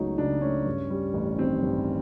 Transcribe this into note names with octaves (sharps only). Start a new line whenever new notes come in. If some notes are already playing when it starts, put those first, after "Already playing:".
Already playing: C#2 C#3 F#3 A3 D#4
C#3 D4
A3 C#4
G2
G3
A1
D#3 C4
G2